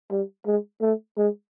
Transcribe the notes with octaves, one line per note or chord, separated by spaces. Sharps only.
G3
G#3
A3
G#3